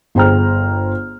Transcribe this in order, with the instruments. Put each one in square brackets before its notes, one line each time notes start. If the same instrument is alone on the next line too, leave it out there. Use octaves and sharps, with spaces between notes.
[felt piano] G1 G#4 C5 G5 A#5 F6